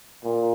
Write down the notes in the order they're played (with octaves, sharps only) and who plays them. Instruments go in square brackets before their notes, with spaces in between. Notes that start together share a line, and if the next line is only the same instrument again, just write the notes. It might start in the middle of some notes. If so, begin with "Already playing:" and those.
[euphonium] A#2